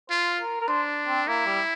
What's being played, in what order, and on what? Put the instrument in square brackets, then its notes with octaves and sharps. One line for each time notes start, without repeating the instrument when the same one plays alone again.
[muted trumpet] F4 [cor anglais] C5
[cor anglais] A#4
A#4
[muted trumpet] D4 [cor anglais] C5
[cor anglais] C4
[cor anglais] A#3 [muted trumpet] E4
[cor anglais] G3